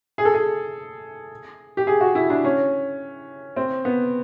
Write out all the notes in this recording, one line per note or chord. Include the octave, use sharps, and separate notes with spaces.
G#4
A4
G#4
G4
G#4
F#4
E4
D4
C#4
C4
B3